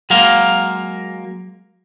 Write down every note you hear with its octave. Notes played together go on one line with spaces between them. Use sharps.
F#3 G#3 A#3 F5